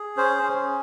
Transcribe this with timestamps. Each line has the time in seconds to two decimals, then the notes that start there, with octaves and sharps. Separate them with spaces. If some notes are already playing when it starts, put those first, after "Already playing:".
Already playing: G#4
0.17 C#4 C5
0.43 C#4